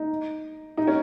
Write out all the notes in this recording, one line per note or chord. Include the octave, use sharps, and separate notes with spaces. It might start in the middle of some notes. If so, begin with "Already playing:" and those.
Already playing: D#4
D#4
C#4